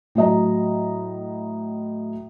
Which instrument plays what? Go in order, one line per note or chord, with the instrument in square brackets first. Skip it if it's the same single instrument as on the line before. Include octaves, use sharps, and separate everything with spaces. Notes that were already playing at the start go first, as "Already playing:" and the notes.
[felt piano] A2 F#3 D#5 A#5